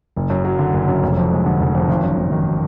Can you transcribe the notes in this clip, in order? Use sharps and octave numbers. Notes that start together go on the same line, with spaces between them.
F#1
F#2
F#3
D3
F#1
F#2
F1
F2
G#3
D3
F1
F2
G#1
F#2
G#1
D#3